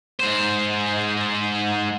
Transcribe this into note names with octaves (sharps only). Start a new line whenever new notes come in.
G#2 C5